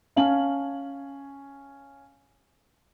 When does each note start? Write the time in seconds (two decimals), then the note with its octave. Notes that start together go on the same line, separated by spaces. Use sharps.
0.16 C#4 F5 G#5 A5 F#7